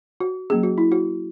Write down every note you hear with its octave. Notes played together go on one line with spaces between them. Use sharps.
F#4
F#3 A#3 C#4 G#4
F#4
E4
F#4